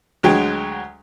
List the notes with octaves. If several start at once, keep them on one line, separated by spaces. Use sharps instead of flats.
D2 F#3 G#3 G5